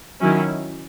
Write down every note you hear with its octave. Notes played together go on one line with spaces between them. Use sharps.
D#3 F#3 C#4 E4